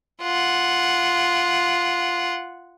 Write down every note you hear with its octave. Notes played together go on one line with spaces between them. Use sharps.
F4 F#5